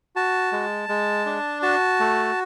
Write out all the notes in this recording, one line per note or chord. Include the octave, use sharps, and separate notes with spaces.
F#4 A5
G#3
G#3
D4
F#4 A5
A3